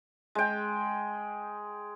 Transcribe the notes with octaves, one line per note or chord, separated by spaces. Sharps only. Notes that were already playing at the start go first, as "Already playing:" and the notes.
G#3 G5